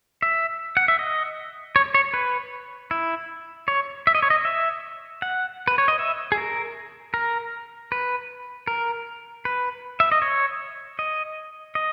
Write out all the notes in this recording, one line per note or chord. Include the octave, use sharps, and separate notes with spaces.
E5
F#5
E5
D#5
C#5
C#5
B4
E4
C#5
E5
D#5
C#5
D#5
E5
F#5
B4
C#5
D#5
E5
G#4
A#4
A#4
B4
A#4
B4
E5
D#5
C#5
D#5
D#5